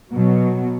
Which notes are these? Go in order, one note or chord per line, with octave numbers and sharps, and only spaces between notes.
B2 F#3